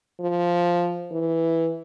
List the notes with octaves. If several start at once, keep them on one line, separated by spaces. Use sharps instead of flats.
F3
E3